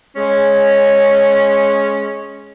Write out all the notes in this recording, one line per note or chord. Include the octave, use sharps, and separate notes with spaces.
G#3 C#4